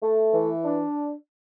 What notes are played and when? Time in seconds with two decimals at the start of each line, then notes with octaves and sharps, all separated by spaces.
0.02 A3
0.34 E3
0.64 D4